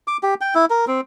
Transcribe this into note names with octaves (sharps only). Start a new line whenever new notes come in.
D6
G4
G5
E4
A#4
C4